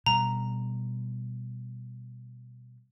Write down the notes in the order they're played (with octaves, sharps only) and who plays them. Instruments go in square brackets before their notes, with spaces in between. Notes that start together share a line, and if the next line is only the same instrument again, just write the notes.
[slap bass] B2 G3 [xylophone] A#5